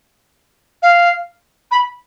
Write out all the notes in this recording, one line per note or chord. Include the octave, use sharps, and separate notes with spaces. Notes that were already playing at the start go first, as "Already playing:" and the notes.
F5
B5